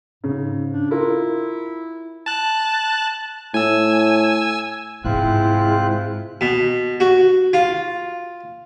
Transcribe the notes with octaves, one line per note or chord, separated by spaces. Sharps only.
G#2 C#3
D4
E4 F4 A#4
A5 F#6
A2 G#5 E6
G#2 C3 G#3 C4 E4 F4 F#6
B2
F#4
F4